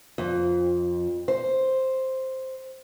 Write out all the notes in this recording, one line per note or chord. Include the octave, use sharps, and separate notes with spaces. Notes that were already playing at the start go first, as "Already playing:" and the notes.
F2
C5